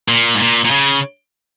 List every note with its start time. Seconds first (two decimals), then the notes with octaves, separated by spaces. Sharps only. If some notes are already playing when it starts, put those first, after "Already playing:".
0.08 A#2
0.35 G#2
0.39 A#2
0.65 A#2
0.71 C#3